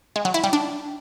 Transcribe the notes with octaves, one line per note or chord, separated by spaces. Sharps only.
G#3
F#3
E4
G3
D4